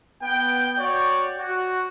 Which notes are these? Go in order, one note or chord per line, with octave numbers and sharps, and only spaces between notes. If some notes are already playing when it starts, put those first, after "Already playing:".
B3 G5
F#4 C#5 D5 G5
F#4